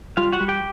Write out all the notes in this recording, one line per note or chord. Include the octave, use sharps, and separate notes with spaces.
G3 F4 F5
F#4 F#5
G3
G4 G5